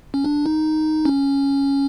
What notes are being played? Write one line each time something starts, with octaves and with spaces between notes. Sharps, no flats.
C#4
D4
D#4
C#4